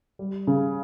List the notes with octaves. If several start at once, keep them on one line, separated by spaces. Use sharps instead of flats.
G3
C#3